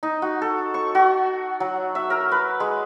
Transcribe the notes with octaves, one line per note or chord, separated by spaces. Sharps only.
D#4
F#4
A4
C#6
F#4
F#3
E5
A#4
B4
G#3